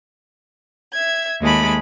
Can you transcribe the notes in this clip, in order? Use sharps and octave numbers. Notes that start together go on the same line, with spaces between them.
E5 G#6
D#2 G#3 A3 B5